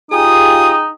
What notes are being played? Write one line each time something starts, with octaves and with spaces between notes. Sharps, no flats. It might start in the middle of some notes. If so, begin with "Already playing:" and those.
D#4 F4 G4 G#4 G5 G#5 D#6